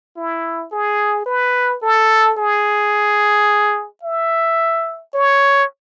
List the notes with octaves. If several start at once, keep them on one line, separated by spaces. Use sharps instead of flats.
E4
G#4
B4
A4
G#4
E5
C#5